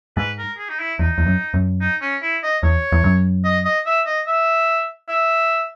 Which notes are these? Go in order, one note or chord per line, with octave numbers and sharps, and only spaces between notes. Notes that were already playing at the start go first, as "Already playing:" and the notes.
G#2 B4
A#4
G#4
D#4
E4
E2 D#4
E2
F#2
F#2
D#4
C#4
E4
D#5
E2 C#5
E2
F#2
D#5
D#5
E5
D#5
E5
E5